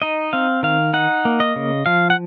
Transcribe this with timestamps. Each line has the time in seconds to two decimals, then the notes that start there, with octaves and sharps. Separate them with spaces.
0.02 D#4 D#5
0.33 C4 F5
0.63 D#3 F5
0.93 D#4 F#5
1.25 A#3
1.40 D#5
1.56 C#3
1.86 F3 F5
2.10 F#5